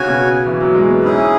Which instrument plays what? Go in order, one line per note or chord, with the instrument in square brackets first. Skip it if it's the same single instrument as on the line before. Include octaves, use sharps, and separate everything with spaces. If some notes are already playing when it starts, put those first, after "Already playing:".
Already playing: [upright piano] C#3 [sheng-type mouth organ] F#4 C#5 G#5
[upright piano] B2
E3
F#3
G#3
B3
[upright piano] G#2 [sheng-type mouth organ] C#4 E4 G#4